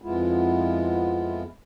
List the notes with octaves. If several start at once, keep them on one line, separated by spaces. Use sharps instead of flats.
F2 G#3 B3 E4 F4